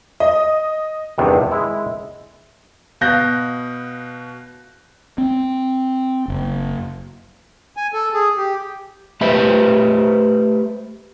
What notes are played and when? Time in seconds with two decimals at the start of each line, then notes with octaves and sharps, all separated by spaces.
0.20 D#5
1.18 E2 G2 C3 D#3
1.51 G#3 E4
3.01 B2 F5 F#6 G6 A#6
5.18 C4
6.28 F#1
7.77 G#5
7.93 A4
8.14 G#4
8.37 G4
9.21 A3 G4 B4 C5 E5